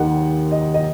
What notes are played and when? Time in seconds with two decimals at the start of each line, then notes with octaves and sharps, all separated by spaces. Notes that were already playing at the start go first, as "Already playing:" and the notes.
Already playing: D#2 D#3 A#3 F#5
0.52 D#5
0.74 D#5